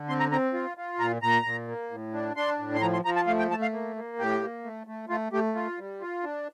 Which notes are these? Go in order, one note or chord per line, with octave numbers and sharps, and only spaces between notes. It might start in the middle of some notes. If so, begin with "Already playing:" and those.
Already playing: D3
C4 C6
A#5
C4 A#5
F4
F4
A#2 A#5
A#2 A#5
A#2
A#3
A2
D4
D4 C6
A2
C6
F3 A#5
C6
F3 A#5
A5
A3 F5
G5
A3 A5
F5
A#3
A#3
A2 G4
A#3
A3
A3
A3 F4
A3 G4
F4
G3
F4
D4